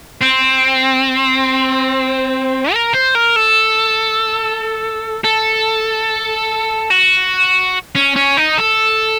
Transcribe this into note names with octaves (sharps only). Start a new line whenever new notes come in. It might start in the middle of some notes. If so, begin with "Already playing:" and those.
C4
A#4
C5
A#4
A4
A4
F#4
C#4
C#4
D#4
A4